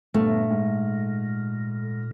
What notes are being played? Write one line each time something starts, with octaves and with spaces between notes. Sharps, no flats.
G1 A#2 A3
G#2